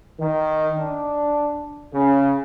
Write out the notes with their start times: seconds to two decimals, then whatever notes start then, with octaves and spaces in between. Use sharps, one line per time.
0.20 D#3
0.79 D4
1.94 C#3